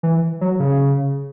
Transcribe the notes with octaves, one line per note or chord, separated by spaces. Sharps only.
E3
F#3
C#3